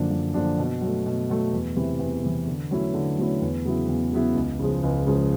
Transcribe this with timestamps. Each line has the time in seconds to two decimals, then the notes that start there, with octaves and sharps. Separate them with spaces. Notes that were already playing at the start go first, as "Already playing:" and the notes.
Already playing: F#2 D3 F3 A#3 D4
0.11 F#2
0.34 D3 F3 A#3 D4
0.58 B2
0.81 F#3
0.87 A3
1.06 B2
1.30 F#3 A3
1.53 E2
1.76 C3 E3
1.99 E2
2.23 C3 E3
2.47 D3
2.71 F#3 A3 C#4 E4
2.94 D3
3.17 F#3 A3 C#4 E4
3.42 E2
3.65 C#3 F#3 B3 E4
3.88 E2
4.12 C#3 F#3 B3 E4
4.36 C#2
4.59 C#3 F3 G#3
4.83 C#2
5.07 C#3 F3 G#3